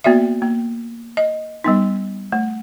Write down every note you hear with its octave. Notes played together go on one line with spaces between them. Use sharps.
A#3 B3 F#4 D5 E5
A#3
D#5
G3 B3 D#4
A3